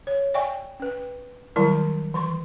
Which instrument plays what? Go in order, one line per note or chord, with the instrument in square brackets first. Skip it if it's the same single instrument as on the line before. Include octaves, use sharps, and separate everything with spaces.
[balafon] C#5
D5 E5 G5 G#5 C#6
C#4 B4
D#3 F#3 G3 E4 A#4
E3 C6 C#6